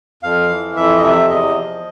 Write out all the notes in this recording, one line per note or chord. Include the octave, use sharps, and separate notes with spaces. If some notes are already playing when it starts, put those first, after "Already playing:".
F2 F5
E3
F2 E5
D#5
C3 E5
E2 D#5
F3